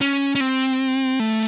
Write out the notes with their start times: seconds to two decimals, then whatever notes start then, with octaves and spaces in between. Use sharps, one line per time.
0.01 C#4
0.35 C#4
0.40 C4
1.20 A3